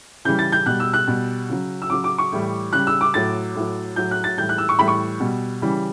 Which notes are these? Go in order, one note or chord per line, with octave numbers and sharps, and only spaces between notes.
C#3 E3 G3 G6
A6
G6
B2 G3 F#6
E6
F#6
B2 G3
C#3 F#3
E6
C#3 F#3 D6
D6
C#6
A2 E3 G3
C#3 G3 F#6
E6
D6
A2 F#3 A6
A2 F#3
A2 F#3 G6
F#6
A6
A2 E3 G3 G6
F#6
E6
C#6
A2 E3 G3 B5
C#6
B2 G3
C#3 E3 G3